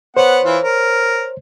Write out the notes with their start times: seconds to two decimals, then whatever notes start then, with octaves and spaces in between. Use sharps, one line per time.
0.17 B3 C5 C#5 F#5
0.44 E3 F4
0.64 A#4